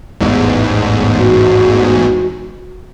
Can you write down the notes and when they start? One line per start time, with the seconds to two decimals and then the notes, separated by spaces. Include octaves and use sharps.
0.21 A1 E2 G#2
1.18 F#4